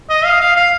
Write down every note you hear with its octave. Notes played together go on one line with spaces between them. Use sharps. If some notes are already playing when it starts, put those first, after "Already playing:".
D#5
F5
F5
F5